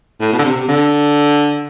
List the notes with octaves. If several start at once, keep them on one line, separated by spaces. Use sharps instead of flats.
A2
B2
D3
C3
C3
D3